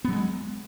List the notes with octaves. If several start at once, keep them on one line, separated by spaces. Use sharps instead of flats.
F#3 G#3 B3